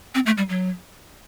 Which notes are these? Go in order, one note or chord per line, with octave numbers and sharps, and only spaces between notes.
C4
A3
G3
F#3